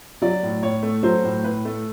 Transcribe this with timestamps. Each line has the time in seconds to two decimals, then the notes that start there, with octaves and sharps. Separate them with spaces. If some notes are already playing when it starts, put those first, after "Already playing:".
0.22 F#3 D5
0.43 A2
0.63 A2 C#5
0.83 A3
1.03 F#3 C5
1.24 A2
1.44 A2 B4
1.65 A3